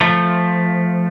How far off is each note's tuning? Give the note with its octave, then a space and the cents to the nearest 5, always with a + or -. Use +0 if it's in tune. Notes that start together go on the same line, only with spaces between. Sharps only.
F3 +0 A3 -5